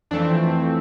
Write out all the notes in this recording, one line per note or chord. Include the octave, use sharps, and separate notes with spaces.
F2 E3 A3 C4 D4